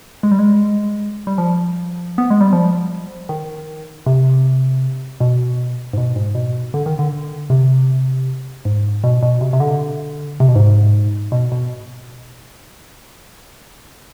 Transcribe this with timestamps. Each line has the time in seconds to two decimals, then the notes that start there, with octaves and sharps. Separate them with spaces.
0.23 G#3
0.31 G3
0.39 G#3
1.27 G3
1.38 F3
2.18 B3
2.30 G#3
2.41 G3
2.53 F3
3.29 D#3
4.06 C3
5.20 B2
5.93 G#2
5.97 B2
6.16 G#2
6.35 B2
6.74 D3
6.86 D#3
6.99 D3
7.50 C3
8.65 G#2
9.04 B2
9.23 B2
9.41 C3
9.53 C3
9.60 D3
10.40 C3
10.48 B2
10.55 G#2
11.32 B2
11.52 B2